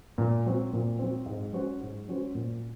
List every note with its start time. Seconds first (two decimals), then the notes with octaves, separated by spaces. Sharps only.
0.18 A#2
0.46 F#3 C4
0.73 A#2
0.99 F#3 C4
1.26 G#2
1.53 F#3 C#4 F#4 C5
1.80 G#2
2.08 F#3 C#4 F#4 C5
2.35 A#2